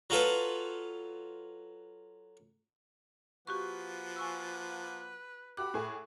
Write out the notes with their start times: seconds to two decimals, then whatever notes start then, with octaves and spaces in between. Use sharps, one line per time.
0.10 F#3 F4 A4 B4
3.47 F3 A#3 F#4 G4 B4 F#5 C#6
4.16 G#5 C#6 E6
5.57 F#4 G4 B5 D6 F#6
5.74 A2 G#4